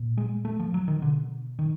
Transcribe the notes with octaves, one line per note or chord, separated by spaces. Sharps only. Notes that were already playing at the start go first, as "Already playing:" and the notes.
Already playing: A#2
G#3
A3
F3
F#3
D#3
B2 D3
D#3